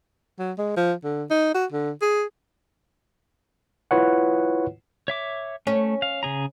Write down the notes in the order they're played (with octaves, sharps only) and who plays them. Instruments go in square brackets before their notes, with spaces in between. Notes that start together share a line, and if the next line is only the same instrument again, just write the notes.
[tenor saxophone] F#3
G#3
F3
D3
D#4
F#4
D3
G#4
[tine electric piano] E4 F4 B4 C#5 F#5
[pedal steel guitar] C#5 E5 D6
[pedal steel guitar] A3 [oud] C#4
[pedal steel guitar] F5
C#3 G#4 A#5